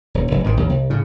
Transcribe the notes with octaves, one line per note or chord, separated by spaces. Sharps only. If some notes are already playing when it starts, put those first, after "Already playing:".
D#1
F1
G#1 G#2 D#3
A1 D#2
C2
A2 C#3